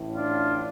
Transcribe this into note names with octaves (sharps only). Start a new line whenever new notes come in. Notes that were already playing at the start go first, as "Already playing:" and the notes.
Already playing: A1 A2
D4 F4